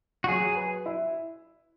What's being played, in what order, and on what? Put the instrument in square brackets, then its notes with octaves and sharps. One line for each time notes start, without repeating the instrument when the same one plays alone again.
[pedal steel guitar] F#4
[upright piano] F#3 [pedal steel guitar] G#4
[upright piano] B4
E4